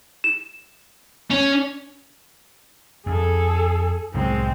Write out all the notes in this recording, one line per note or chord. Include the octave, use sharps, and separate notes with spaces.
E7
C#4
F2 G#4 A4
C2 A2 F#3 G#3 C4